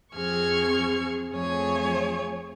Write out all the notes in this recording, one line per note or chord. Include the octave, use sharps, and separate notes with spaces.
F2 C4 G#4 C#6 F6 G#6
F2 A3 G#4 C#5 G#5